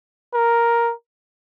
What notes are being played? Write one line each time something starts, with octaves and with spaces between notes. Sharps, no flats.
A#4